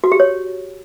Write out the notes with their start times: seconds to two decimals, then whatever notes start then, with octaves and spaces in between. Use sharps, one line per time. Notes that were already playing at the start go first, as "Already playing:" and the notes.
0.04 F#4
0.12 G4
0.20 C#5